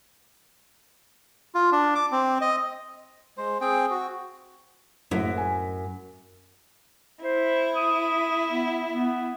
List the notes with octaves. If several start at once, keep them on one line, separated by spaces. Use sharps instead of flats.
F4
D4
D6
C4
D#5
G#3 C5
C4 G#4 G5
F#4
F#1 F#2 A2 B6
G#5
E4 C5
D#6
B3
B3